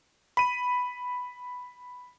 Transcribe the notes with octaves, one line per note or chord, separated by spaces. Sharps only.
B5 D#7